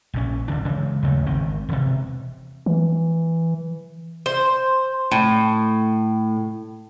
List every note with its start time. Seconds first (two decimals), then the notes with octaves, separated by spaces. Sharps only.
0.14 A#1 A#2 C#4
0.48 G#1 D2 D3 D4
0.65 C#3 E3 G#3
1.03 D#2 C#3 G#3 A3
1.26 G#1 D#3 C4
1.69 E1 C3
2.66 E3
4.26 C5
5.12 A2